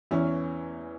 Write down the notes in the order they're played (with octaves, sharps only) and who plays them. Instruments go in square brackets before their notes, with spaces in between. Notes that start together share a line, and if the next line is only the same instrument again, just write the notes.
[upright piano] E2 E3 C#4 E4